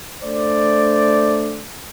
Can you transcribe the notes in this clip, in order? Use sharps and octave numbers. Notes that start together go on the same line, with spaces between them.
A3 D4 C5 D5